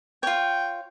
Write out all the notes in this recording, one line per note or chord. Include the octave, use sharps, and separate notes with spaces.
F4 C#5 G5